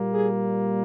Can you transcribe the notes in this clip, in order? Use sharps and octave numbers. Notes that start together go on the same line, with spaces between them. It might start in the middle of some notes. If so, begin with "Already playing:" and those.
Already playing: A#2 G3 A#3
G#4